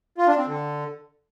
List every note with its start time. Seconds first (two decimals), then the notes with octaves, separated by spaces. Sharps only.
0.18 F4
0.27 D4
0.37 C4
0.47 D3